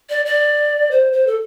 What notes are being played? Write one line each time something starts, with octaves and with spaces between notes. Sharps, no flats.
D5
D5
C5
C5
A4